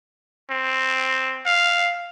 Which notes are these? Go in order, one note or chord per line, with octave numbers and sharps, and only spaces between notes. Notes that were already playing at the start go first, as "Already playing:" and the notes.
C4
F5